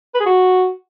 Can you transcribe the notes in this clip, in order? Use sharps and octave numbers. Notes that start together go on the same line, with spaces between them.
B4
G#4
F#4